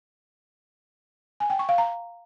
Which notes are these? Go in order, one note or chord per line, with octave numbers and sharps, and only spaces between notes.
G#5
G5
C#6
F5
A#5